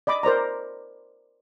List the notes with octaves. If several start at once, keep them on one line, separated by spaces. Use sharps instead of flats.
D5 D#5 B5 D6
A#4 C5 D5 A#5